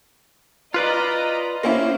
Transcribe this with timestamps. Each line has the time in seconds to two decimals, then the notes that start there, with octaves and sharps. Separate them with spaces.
0.74 F4 B4 D5 D#5 A#5 B5
1.63 A#3 C#4 E4 C5